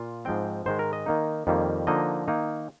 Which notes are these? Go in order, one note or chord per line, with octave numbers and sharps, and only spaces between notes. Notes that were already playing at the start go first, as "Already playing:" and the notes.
Already playing: A#2 F4
G#2 F3 G#3 C4 G5
G#2 D#3 G#3 C5
A#4
D#5
D#3 A#3 D#4
F2 D#3 G3 A#3
D3 F3 A#3 D#4 D#5
D#3 A#3 D#4